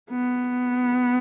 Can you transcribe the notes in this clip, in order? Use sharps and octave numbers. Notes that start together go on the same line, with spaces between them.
B3